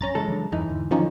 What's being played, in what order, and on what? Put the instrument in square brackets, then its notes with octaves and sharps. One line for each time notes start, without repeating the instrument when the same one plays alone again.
[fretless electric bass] A#1 F#2 [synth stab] C#4 A#5 A6
[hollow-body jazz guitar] C#2 G#3 A4 [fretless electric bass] E3
[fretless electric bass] E3 F#3 D4
[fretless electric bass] E2 G2 [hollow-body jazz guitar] E3 D#4
[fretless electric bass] E2 G#2 D3
[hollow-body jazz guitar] D3 D#3 [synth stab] F3 C#4 D#4 [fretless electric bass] F#3